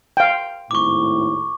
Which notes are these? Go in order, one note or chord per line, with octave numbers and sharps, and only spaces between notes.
F5 G5
G#1 D#2 A2 C#6 D6